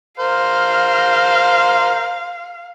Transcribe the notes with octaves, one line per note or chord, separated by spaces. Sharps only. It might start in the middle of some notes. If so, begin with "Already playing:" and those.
A#4 C5 F5